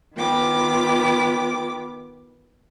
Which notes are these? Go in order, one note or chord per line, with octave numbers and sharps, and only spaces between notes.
D#3 B3 F4 G5 D6